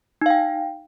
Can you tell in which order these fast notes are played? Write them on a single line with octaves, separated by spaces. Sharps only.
D#4 F5 G5